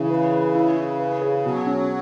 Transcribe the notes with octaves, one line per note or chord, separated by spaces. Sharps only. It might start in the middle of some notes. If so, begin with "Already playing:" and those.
Already playing: C#3 E3
B4
B4
E4
E4
B4
G#4
B2 F#3
C#4